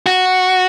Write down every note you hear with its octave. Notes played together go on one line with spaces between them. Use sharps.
F#4